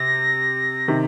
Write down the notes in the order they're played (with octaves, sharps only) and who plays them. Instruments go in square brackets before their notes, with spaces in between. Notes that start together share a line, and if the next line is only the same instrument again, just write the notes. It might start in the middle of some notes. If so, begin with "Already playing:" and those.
Already playing: [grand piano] C3 [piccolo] A#6
[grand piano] C3 D#3